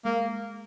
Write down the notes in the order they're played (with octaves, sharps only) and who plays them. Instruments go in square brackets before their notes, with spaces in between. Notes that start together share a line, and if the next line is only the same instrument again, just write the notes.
[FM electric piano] G#3 [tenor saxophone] A#3